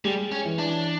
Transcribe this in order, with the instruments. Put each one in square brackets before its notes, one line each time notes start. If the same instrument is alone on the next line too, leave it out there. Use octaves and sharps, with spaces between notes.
[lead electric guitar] G3 [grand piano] G#3
[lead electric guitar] C#4
[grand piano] E3
[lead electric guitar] D4